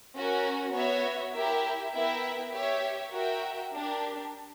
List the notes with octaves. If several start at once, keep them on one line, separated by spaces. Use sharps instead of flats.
C#4 F#4 A#4
B3 F#4 C#5 E5
E4 G4 A#4 E5
B3 E4 A#4 E5 G5
G4 C#5 E5
F#4 A#4 E5 G5
D4 G4 A#4